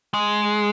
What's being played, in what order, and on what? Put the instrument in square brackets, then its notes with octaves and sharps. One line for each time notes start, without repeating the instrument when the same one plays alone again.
[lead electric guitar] G#3